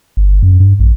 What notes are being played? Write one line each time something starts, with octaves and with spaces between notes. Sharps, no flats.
G1
F#2
G2
A#1